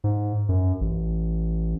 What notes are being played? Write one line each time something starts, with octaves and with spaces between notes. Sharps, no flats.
G#2
F#2
A1